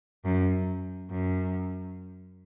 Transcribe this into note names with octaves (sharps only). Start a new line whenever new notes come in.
F#2
F#2